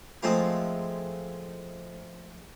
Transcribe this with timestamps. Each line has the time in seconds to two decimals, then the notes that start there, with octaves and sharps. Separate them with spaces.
0.23 F3 G#3 A3 C4 F4 A#4